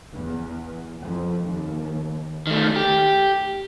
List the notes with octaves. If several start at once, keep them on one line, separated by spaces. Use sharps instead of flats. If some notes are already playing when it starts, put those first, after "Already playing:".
E2
F2
D#2
D#3 A3
G4